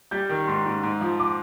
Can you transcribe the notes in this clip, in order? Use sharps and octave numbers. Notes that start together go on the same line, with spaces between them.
G3 G6
D#3
G#2 C6
G#2
G#2
F3
D6